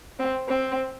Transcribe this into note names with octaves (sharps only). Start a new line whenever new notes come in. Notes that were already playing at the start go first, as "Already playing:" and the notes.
C4
C4